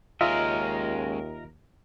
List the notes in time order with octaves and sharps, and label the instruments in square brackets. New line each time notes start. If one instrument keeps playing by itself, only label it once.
[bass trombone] D#2 [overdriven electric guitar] G#3 C#4 [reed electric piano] F4 D#5 E5 [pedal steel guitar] A#4